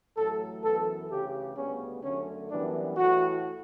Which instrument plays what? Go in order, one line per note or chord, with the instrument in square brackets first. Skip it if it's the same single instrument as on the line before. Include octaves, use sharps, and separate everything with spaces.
[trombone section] A1 A2 F#3 A4
F#2 E3 B3 A4
D2 C#3 E3 G4
D2 C#3 G3 B3 C#4
F#2 D3 A3 C#4
F#2 E3 G3 B3 D4
A2 E3 A3 F#4